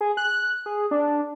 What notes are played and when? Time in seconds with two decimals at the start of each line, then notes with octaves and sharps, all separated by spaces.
0.01 G#4
0.17 F#6
0.66 G#4
0.91 D4